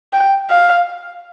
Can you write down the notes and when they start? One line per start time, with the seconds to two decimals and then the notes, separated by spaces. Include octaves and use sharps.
0.13 G5
0.50 F5